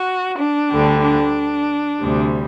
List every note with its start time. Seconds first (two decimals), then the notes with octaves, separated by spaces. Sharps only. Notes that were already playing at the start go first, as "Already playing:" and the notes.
Already playing: F#4
0.38 D4
0.71 D2 D3 G3
1.03 D4
2.01 D2 C3 G3